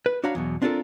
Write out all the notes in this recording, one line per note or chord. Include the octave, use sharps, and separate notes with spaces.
B4
D4 F#4 C#5 F5 A#5 B5
E2 B2 F#3
C4 D4 F4 G4 A4 A#4